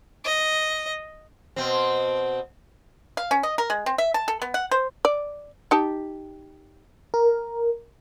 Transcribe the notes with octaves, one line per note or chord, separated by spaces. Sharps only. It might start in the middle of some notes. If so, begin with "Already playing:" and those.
D#5
B2 C4
F5
C#4
D#5
A#4
G#3
C4
E5
A5
A4
B3
F#5
C5
D5
D#4 G4 A5
A#4